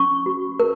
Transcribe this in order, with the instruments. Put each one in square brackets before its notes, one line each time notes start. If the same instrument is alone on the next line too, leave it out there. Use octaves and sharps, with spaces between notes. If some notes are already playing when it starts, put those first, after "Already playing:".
Already playing: [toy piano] C#4 C#6
F#4
A#4